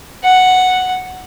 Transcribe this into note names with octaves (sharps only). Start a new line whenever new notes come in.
F#5